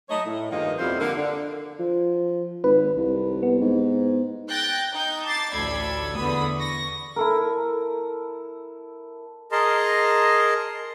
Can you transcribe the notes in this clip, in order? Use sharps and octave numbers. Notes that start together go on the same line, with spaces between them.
F#3 A3 D#4 C#5 D#5
A2
G2 D#3 F3 G#3 A#3 D#4
F2 B2 G3 E4 C5 F5
D3 A#3
D3
F3
G#1 B4
C2
B3
G#2
G5 F#6 G6 A6 A#6
D#4 G6
A5 D6 A6 C7
A1 D2 A4 D5 B5 G#6
E2 D3 B3 B5 D#6
C#6 A#6
E4 A4 A#4
G#4 A#4 D#5 A5 A#5 C6